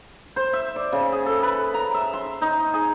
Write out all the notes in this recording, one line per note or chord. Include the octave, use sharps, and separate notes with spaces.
C5
E5
D5
C#3
G#4
A4
B4
A#5
E5
C6
D#4
G#4